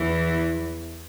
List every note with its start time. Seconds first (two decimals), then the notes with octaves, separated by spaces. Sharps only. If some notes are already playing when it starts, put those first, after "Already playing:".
Already playing: E2 E3